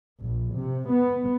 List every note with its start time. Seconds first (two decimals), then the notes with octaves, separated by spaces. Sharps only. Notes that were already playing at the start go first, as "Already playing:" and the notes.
0.22 A#1
0.58 C3
0.92 B3